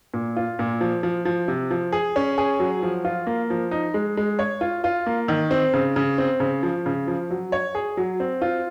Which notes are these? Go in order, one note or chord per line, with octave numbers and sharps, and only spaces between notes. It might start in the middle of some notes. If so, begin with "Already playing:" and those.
A#2
F4
A#2
F3
F3
F3
C3
F3
G#4
C#4
G#4
F#3
F3
F4
A#3
F3
D#4
G#3
G#3
C#5
F4
F4
A#3
D#3
C4
C#3
C#3
C4
C#3
F3
C#3
F3
F#3
C#5
G#4
F#3
C4
F4